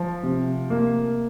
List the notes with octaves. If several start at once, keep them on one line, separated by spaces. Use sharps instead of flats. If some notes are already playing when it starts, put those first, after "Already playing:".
Already playing: F3
C3
A#3